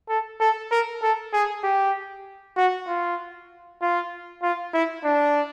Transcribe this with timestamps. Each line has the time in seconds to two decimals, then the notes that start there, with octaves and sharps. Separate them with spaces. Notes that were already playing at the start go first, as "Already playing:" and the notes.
0.09 A4
0.40 A4
0.71 A#4
1.02 A4
1.33 G#4
1.64 G4
2.57 F#4
2.88 F4
3.82 F4
4.43 F4
4.74 E4
5.04 D4